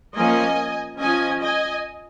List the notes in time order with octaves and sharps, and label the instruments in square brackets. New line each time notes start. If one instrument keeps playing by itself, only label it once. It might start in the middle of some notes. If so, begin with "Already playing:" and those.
[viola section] F3 A#3 C#4 D#5 G#5
F3 C#4 D#5 G#5
D#5 G#5